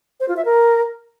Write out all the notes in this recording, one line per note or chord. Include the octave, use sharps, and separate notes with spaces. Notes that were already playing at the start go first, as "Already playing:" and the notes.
C5
F4
E5
A#4